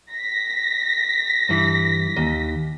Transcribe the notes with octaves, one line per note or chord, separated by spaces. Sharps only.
A#6 B6
G2 E3
D#2